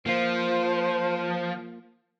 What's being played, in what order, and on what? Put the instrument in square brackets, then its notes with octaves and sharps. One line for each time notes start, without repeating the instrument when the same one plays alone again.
[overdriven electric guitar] F3 [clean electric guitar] A#3 F4 [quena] C5